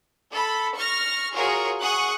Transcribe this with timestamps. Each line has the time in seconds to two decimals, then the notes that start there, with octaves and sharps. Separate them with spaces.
0.31 A4 B5
0.76 C#6 F6 A#6
1.32 F4 F#4 G#4 A#4 C#5
1.81 G#4 F#5 C#6 D#6 F#6